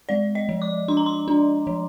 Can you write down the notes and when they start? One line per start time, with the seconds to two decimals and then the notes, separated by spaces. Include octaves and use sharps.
0.09 G#3 D5
0.35 D#5
0.49 F3
0.62 D6
0.88 D4 C6
0.97 A#5
1.06 C6
1.28 D4
1.67 F3